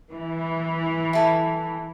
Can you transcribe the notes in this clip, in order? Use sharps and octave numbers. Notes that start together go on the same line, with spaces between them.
E3
E4 A4